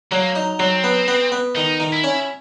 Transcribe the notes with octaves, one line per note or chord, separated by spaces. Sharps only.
F#3 A#3
D#4
F#3 C4
B3
B3
B3
D#3 D#4
D#3
E4
C#4